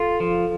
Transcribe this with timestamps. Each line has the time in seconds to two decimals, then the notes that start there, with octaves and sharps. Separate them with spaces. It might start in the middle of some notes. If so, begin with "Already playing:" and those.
Already playing: F4 A4
0.20 F3